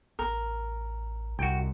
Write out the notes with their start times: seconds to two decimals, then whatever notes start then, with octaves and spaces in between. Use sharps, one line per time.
0.19 A1 A#4
1.39 C2 F#4 G5